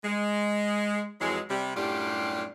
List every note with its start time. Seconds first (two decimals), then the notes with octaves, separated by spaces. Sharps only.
0.04 G#3
1.20 F2 E3 F#3 G#3
1.50 C3 G3
1.76 F#2 A2 G3 D4 F4 G4